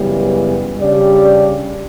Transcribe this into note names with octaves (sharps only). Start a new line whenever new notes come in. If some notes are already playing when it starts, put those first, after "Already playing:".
Already playing: F#2 C#3 E3 G3 B3
C#3 G3 D4 G4 D5